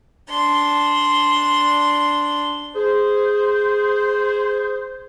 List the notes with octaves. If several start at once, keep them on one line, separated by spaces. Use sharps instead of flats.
D4 C6
G#4 C5